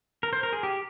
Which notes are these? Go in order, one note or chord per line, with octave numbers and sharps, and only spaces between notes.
A#4
C5
A#4
G#4
G4